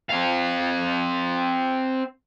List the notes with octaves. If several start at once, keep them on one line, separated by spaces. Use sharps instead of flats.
C4 F5